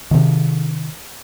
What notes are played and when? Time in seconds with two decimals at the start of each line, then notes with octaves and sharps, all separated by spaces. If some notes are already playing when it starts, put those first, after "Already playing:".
0.11 C3 D#3